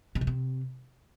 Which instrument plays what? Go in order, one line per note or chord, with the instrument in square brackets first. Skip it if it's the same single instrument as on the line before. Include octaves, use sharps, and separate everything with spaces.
[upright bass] C3
F#3
C3